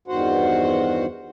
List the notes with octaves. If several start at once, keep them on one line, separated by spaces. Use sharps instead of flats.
E2 G2 D#3 F#4 C5 F#5